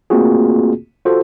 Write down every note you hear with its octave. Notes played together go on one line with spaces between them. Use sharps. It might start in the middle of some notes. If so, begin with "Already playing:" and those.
A3 A#3 C4 F4 F#4 G#4
F4 F#4 A4 C5